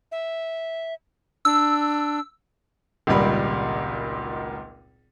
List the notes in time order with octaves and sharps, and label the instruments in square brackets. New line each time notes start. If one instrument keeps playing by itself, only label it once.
[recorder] E5
[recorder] D4 [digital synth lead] E6
[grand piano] G#1 C#2 A#2 G3 B5